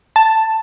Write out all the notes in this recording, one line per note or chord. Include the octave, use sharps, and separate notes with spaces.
A5